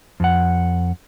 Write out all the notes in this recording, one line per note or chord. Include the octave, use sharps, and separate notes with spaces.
F2 F#5